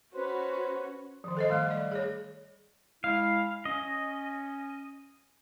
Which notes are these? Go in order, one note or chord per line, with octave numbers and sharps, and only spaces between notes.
C#4 F#4 B4 C5
D#3 F3
A4 C5 D#5
D#3 G3 A3 D#5
D5
G#4 C#5
G#3 E4 F5
C#4 D#5